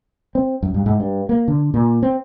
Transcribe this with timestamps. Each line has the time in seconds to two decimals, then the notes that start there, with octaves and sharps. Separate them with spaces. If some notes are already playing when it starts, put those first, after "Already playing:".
0.35 C4
0.63 F#2
0.74 G2
0.86 G#2
1.00 G2
1.29 A#3
1.48 D3
1.74 A#2
2.02 C4